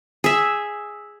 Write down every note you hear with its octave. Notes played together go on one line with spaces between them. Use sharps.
G#4 E5